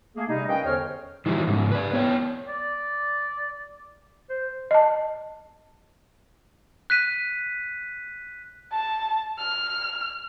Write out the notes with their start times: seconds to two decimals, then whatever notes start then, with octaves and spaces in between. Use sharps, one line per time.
0.16 A3 A#3 G#4
0.29 C3 G3 D#4
0.48 C#4 A#4 B4 D#5 F5 G5
0.66 E2 D3 C5 C#5 G5 F6
1.26 D#3 E3 F#3 G3 E4
1.47 G#2 C#3
1.72 B4 D5
1.93 B3 C#5 E5 G5
2.48 D5
4.30 C5
4.71 D#5 A5
6.90 F#6 B6 D#7
8.72 A5
9.39 F6